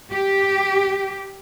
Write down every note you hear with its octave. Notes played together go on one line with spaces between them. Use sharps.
G4